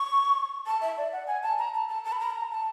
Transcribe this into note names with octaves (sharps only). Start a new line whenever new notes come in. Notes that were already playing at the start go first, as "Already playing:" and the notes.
Already playing: C#6
A5
E5
D5
F#5
G#5
A5
A#5
A5
A5
A5
B5
A#5
A5
A#5
A5